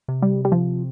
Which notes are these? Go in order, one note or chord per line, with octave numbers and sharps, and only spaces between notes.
C3
G3
G3
F3